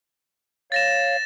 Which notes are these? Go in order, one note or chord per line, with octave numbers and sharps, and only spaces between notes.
C#5 F5 A6 A#6 E7